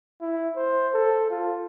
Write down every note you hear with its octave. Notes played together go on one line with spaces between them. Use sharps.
E4
C5
A4
F4